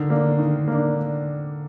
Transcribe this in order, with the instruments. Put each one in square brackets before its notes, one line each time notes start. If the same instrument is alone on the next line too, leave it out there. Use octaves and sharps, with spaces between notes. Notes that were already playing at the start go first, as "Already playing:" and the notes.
Already playing: [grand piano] D3 [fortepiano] D#3
[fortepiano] A#3 D4
D#3
A#3 D4